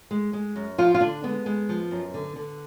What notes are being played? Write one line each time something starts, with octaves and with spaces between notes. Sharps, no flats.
G#3
G#3
F#2
F3 F4
F4
D3 D4
G#3 B3
G#3 B3
F3
F#2
D3
D3